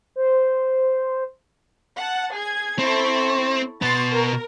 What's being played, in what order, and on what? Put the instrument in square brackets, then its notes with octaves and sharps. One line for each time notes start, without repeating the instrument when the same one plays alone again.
[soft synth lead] C5
[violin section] F#5 A5
G#4 G#6
[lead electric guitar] C4 [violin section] E4 A4 C#6
[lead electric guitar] B2 B3 [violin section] C6 A6
[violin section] A#4